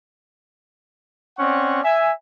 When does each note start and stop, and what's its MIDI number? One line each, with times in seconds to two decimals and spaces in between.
1.38 1.82 60
1.38 1.82 61
1.38 1.82 74
1.38 1.82 78
1.38 1.82 85
1.84 2.11 76
1.84 2.11 80